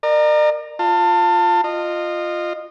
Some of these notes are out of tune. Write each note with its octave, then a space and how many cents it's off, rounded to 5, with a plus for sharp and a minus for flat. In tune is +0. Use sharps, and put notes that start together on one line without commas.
A#4 +0 D5 +45
F4 +0 A5 +30
F4 +0 D#5 -25